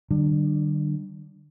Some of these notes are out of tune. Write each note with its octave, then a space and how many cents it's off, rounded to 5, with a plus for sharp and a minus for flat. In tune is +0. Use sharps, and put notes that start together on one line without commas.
D3 +40 G3 -25 D4 +25